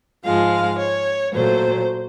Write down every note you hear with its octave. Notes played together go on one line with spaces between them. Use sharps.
G#2 F3 G#3 F5
C#5
A#2 F#3 A3 C5